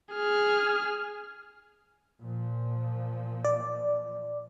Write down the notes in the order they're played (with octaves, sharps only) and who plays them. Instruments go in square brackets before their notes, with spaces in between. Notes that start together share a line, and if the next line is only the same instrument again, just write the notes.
[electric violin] G#4 F6
[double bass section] A#2 F3
[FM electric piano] D5